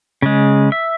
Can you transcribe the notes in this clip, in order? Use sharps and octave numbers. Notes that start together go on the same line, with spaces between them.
C#3 G#3
E5